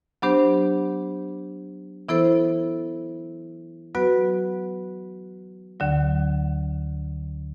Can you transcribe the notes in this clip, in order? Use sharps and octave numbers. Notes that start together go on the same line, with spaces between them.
F#3 B3 D4 G4 C5
E3 B3 E4 A4 C5
F#3 B3 F#4 B4
D2 D3 F#3